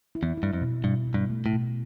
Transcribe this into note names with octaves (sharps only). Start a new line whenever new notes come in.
E4
E2
E4
G2
F2
B2
G2 B2
B2
G2
A3
A2
B2